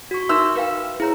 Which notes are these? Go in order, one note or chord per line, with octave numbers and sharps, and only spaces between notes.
F#4 C#6
D#4 A#4 E5 C6 E6
A#4 B4 F5 G5
E4 G#4 C#5 A#5